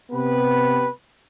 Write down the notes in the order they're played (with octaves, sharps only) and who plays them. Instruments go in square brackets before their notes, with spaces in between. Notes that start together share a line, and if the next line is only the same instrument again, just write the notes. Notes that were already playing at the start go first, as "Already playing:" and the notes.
[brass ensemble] C3 B3 G4 B4